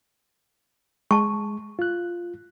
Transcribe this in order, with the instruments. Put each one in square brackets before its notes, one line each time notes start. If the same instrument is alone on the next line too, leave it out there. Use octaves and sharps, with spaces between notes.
[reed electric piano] G#3 [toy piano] A5 C#6
[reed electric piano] F4 F#6